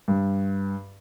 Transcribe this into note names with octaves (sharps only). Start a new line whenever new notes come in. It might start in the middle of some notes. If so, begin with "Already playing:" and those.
G2